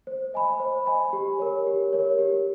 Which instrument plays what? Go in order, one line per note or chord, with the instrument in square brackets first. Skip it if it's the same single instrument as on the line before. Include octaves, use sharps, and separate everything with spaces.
[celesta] C5
D#5 G#5 B5
C5
D#5 G#5 B5
G4
A#4 C#5
G4
A#4 C#5
G4